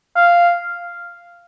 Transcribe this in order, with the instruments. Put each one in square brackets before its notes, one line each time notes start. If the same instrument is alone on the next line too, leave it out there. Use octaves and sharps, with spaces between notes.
[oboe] F5